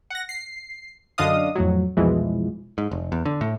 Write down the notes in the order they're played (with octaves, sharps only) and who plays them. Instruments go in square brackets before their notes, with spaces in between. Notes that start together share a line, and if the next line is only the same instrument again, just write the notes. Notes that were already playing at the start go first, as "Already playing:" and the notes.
[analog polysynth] F#5 A#6
C7
F#2 D3 D4 D#5 F5 D#6
F2 A2 F#3
C2 F2 B2 E3 F3 G#3
[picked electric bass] G#2
F1
E2
D3
A2